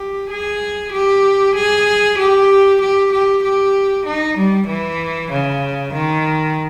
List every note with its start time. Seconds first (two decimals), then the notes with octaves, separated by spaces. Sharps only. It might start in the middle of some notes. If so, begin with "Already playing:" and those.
Already playing: G4
0.31 G#4
0.93 G4
1.56 G#4
2.18 G4
2.81 G4
3.12 G4
3.44 G4
4.06 D#4
4.38 G3
4.68 E3
5.31 C#3
5.94 D#3